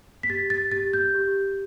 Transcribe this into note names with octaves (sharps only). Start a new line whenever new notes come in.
B6
G4 A6
A6
G4 A6
G6
G4